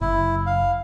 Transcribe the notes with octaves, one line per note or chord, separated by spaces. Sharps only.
F#1 E4
F5